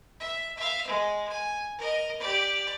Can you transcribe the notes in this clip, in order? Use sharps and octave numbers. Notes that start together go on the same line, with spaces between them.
E5
E5 F5
G#3
G#5
A#4 D#5
G4 D5